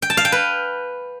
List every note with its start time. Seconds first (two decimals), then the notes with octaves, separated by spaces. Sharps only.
0.02 G5
0.10 A5
0.17 F5
0.25 G5
0.32 B4